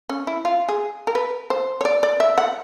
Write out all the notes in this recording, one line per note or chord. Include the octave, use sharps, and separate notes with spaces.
C#4
E4
F4
G#4
A#4
B4
C5
C#5
D5
D5
E5
F#5